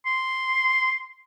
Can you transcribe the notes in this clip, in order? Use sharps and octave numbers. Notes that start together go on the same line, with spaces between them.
C6